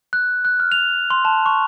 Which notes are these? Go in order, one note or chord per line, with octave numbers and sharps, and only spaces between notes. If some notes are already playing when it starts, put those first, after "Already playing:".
F#6
F#6
F6
F7
C6
A5
C#6